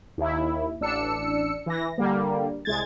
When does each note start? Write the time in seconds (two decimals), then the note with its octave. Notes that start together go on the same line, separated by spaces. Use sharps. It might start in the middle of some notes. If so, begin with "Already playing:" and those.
0.18 D#2 E4
0.80 A1 D4 E6 C#7
1.66 E3 A#6
1.98 D3 G3 A#3
2.65 C2 G#3 G#6 A6